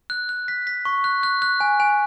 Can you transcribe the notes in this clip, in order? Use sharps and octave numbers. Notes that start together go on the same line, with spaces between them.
F#6
F#6
B6
B6
C#6
F#6
F#6
F#6
G#5
G#5